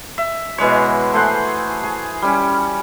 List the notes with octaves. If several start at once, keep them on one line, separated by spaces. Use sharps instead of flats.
E5
B2 E3 G#3 C#5
A3 G#4 C5 F#5
G#4
G3 C#4